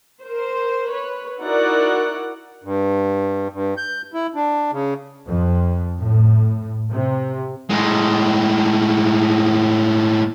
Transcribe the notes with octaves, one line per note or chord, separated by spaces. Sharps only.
A#4 C5
B4 C#5
D#4 E4 F#4 A#4 D5 F#5
G2
G2
G6
E4
D4
C#3
F2
A2
C3
A2 G#3